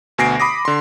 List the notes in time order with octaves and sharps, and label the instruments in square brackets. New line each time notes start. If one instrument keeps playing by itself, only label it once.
[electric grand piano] D2 B2 G#5 A#6 C7 D7
B5 D6 D#6 A#6
D3 C6